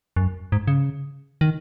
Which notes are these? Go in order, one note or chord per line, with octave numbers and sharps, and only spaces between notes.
F#2
G#2
C#3
D#3